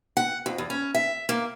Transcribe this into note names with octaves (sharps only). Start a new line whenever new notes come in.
F#5
F2
E2
C#4
E5
A#3